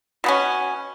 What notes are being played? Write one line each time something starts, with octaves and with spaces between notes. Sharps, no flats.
B2 B3 C#4